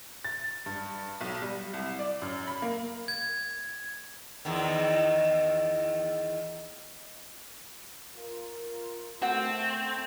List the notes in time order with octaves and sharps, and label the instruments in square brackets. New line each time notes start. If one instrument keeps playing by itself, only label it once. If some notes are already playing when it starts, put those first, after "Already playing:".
[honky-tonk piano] A6
G2
B1
G3
C2
D5
F#2
B5
A#3
[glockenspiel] G#6
[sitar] E2 D#3
[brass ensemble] F4 A#4
[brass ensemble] A3 [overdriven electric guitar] C4 [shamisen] F#4 F#5